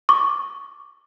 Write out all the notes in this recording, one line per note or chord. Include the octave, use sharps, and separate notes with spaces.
C#6 D6